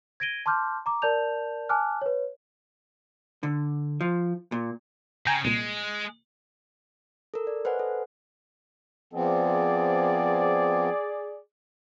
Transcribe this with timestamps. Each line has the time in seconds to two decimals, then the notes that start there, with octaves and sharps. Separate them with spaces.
0.20 G#6 A#6 D7 D#7 G7
0.46 A5 C6 D6 F6 G6
0.86 A#5 D6
1.02 A#4 D5 A5 G6 F7
1.69 G#5 A5 D6 F6 F#6
2.02 B4 C#5
3.43 D3
4.01 F3
4.52 A#2
5.27 C#3 G5 G#5 A#5
5.45 C2 A#2 G#3
7.34 A4 A#4
7.47 D5
7.65 B4 C5 D#5 F#5 G#5
7.79 A4
9.13 F3 B3 C4 G#4 D5